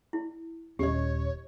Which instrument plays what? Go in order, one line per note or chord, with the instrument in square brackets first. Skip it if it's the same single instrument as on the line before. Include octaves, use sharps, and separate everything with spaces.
[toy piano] E4
[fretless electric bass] D#1 C#4 [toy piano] G4 D#5 [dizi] C#5